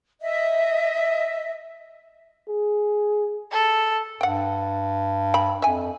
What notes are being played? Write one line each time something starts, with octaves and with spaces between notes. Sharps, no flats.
D#5 E5
G#4
A4
G2 F#5 G5
G5 B5
F2 E5 G#5